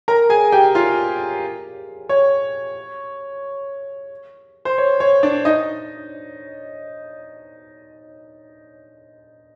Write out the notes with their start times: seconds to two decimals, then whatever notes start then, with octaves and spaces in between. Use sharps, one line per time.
0.08 A#4 A#5
0.30 G#4 G#5
0.52 G4 G5
0.75 F4 F5
2.09 C#5
4.65 C5
4.78 C#5
5.00 C#5
5.23 D4 D5
5.45 D#4 D#5